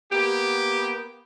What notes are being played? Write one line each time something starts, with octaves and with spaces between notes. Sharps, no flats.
A#3 B3 G4